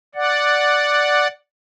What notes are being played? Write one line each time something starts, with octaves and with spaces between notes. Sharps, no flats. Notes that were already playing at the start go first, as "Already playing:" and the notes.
D5 F#5